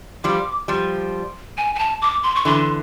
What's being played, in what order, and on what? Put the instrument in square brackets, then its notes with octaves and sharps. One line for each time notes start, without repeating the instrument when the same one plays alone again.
[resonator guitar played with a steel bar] F3 G3 [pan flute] D6
[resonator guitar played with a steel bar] F3 G3
[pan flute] G#5
G#5
A5
D6
C6
C#6
[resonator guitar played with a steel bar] D3 E3 [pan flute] C6